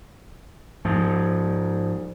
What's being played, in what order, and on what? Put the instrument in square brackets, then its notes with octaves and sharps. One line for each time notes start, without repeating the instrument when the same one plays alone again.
[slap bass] G#2 F3